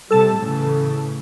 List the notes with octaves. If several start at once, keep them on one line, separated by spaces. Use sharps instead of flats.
C3 G3 A4 A5
A2 C#3 E3